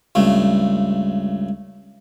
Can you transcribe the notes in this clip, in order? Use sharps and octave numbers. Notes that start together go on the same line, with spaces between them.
C#2 G2 A3